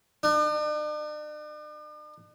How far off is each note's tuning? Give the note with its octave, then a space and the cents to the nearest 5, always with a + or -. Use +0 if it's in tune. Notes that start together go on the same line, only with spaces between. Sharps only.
D4 +45